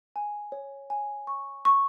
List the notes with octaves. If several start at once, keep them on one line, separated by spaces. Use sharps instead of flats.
G#5
C#5
G#5
C#6
C#6